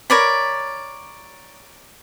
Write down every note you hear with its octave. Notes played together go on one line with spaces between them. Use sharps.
A#4 C#5 D5 B5